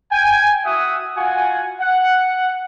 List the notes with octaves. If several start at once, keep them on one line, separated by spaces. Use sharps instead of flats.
G5 G#5
E4 F#4 E5 F#5 D#6
F4 F#4 F#5 G#5
F#5